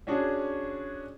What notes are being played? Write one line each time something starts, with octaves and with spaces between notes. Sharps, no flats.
C#4 D4 F#4 G#4